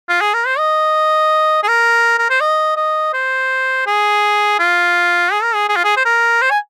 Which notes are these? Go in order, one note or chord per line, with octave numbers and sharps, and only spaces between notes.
F4
G#4
A#4
C5
D#5
G#4
A#4
A#4
C5
D#5
D#5
C5
G#4
F4
G#4
A#4
G#4
G#4
F4
G#4
C5
A#4
C5
G#5